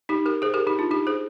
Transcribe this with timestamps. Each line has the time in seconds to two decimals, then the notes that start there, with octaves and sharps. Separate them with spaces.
0.09 D#4 G4
0.26 G4 A#4
0.42 G#4 C5
0.54 G4 A#4
0.67 D#4 G4
0.79 D4 F4
0.91 D#4 G4
1.07 G#4 C5